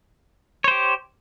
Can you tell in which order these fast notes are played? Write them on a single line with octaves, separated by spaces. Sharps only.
C#5 C5 G4